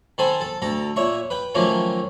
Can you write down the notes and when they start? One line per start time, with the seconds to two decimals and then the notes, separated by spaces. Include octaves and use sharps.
0.18 D#3 A4 C5 G#5 B5
0.41 A4
0.62 D2 A4 A#5
0.96 A#2 C#5 E5 C#6
1.30 B4 G5
1.54 D#3 F3 F#3 A3 A#3 C#4